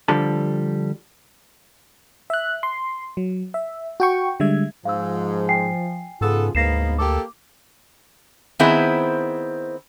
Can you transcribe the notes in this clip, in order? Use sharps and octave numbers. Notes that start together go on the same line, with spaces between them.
D3 F3 G3 A4
E5 F#6
C6
F#3
E5
F#4 G5 C#6
D3 G3 G#3 E5 G#6
G#2 F3 F5 E6
G5 G#5 C7
G#2 C#3 B3 F4 G#4 A4
D2 G#2 A#3 B3 A#6 C7 E7
A#3 G4 A4 D6
D#3 B3 C4 E4 G#4 C5